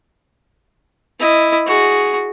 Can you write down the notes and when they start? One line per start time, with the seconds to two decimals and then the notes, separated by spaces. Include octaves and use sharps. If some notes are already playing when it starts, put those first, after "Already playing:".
1.20 E4 D#5
1.66 F#4 G#4